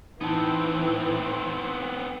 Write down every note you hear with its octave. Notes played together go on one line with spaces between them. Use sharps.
A2 E3 B3 C4 D#4 A5